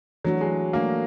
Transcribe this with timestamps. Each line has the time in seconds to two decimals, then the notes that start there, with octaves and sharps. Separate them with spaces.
0.24 E3 F#3 A3 D4 F#4
0.41 G#3
0.73 E3 A3 A#3 D4 F#4